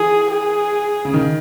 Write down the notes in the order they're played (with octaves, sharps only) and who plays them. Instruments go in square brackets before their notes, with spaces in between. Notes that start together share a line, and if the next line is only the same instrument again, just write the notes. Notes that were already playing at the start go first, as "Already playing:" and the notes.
Already playing: [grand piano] E3 [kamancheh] G#4
[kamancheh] G#4
[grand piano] C#3
D#3